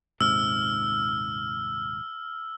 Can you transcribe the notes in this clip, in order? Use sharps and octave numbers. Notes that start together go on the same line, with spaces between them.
D#1 G#2 C3 E6 F6